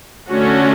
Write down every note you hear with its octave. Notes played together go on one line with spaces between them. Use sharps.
D3 A3 C#4 F#4